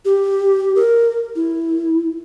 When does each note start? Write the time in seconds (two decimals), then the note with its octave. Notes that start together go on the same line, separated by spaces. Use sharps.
0.05 G4
0.76 A#4
1.36 E4